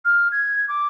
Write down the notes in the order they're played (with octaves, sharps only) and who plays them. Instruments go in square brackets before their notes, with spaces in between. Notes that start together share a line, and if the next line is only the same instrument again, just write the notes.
[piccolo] F6
G#6
D6